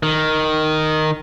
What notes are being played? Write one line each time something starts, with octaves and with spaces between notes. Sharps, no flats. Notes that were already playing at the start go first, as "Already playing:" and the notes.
D#3